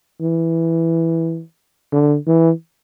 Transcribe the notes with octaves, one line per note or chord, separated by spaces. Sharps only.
E3
D3
E3